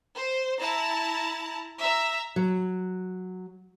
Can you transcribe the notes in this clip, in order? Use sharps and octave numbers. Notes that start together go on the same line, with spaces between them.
C5
E4 A5 A#5
E5 A#5
F#3